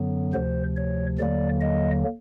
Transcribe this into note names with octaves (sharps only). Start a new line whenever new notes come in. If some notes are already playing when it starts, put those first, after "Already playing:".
Already playing: F#2 D3 F#3 B3
D2 C3 F3 C5
C#5
D#2 D3 F#3 A#3 D5
D#5